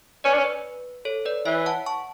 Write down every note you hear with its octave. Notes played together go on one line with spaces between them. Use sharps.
C#4 B4 D5
D4
C#4
B4
A4 C#5
B4 D5
E3 C#5 E5
F#5 A5
A5 C#6